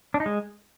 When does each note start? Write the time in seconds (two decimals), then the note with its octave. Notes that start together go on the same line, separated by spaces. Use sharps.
0.14 D4
0.20 D#4
0.26 G#3